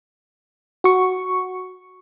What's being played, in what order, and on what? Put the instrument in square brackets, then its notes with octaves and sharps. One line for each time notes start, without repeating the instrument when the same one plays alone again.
[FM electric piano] F#4 C#6